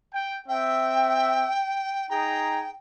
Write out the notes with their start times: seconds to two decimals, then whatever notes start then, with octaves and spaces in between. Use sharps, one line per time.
0.14 G5
0.49 C4 E5 G5
2.10 D#4 G#4 G5 A#5